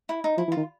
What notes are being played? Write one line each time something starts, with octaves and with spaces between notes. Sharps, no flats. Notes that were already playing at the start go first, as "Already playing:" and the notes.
E4
D#4
F3 E4
E3
F4
D#3